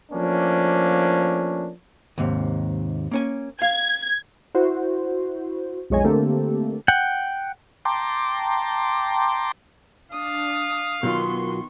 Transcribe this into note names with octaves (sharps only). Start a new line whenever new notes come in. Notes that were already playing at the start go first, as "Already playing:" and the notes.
F3 A3 A#3 C#4 D4
D#2 G#2 C3
A#3 C#4 G#5
F5 G#6
E4 F#4 C5
B1 F2 G#3 C#5 D#5 G#5
D3 A3 A#3 C4 G4 A4
F#5 G5
G5 A5 A#5 C6 D6
D4 F5 D#6
B2 D#3 F#3 B3 F4 C6 C#6